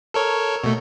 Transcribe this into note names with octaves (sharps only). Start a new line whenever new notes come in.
A4 A#4 C#5
B2 A3